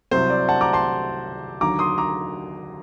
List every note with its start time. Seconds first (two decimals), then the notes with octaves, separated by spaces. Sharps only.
0.11 C2 C3 F#3 C4 C5
0.30 D5
0.49 F#5 A5
0.61 A#5 D6
0.73 A5 C6
1.61 D#2 D3 F#3 A#5 D6
1.79 C6 D#6
1.98 A#5 D6